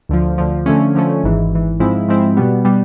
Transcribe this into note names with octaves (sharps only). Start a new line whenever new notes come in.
D2 D3 F3
D2 D3 F3
D3 F3 A3 C#4
D3 F3 A3 C#4
G#1 G#2 E3
G#1 G#2 E3
G#2 F3 G#3 C4 E4
G#2 F3 G#3 C4 E4
B2 G3 B3
B2 G3 B3